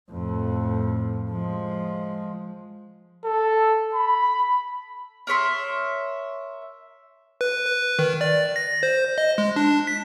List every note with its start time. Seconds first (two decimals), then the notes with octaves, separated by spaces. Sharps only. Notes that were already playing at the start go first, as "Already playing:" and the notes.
0.10 F2 A2
1.31 F3 G#3
3.25 A4
3.94 B5
5.27 A#4 C#5 E5 C6
7.41 B4
7.66 B4
7.99 D#3
8.21 D5
8.56 A#6
8.83 C5
9.18 D#5
9.38 G#3
9.56 D4
9.87 B6